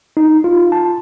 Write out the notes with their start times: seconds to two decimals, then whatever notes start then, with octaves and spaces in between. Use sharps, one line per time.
0.17 D#4
0.44 F4
0.72 A5